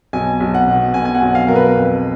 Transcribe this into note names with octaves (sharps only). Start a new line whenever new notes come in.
B1 G#5
B1
F#5
B2
B2 G#5
G#5
F#5
B1
F5
B1 A#4
B4
F2